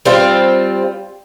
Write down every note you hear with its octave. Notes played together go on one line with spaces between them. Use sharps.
G3 C4 F4